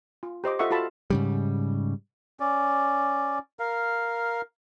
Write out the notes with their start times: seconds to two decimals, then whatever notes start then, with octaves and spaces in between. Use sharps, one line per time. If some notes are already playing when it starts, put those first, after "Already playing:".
0.23 F4
0.44 G4 C5 D#5 D6
0.59 F4 A4 D#5 E5 F#5 C#6
0.71 F4 F#4 A4 A5 B5
1.10 G#2 C#3 G3
2.40 C#4 D5
3.59 A#4 F5